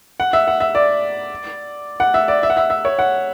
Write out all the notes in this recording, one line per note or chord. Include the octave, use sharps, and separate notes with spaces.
F#5
E5
F#5
E5
D5
F#5
E5
D5
E5
F#5
E5
E5
C#5
F#5